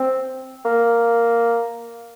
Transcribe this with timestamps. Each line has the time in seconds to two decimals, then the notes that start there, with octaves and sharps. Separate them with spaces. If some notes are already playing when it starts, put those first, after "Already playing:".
Already playing: C4
0.65 A#3